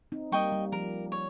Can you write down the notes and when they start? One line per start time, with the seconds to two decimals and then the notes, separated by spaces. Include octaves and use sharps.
0.12 C4 D#4
0.32 G3 A#3 D#5 G5 C#6
0.52 G3
0.72 F3 A#4
1.12 C#5